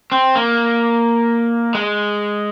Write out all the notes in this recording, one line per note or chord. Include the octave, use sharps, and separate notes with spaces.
C4
A#3
G#3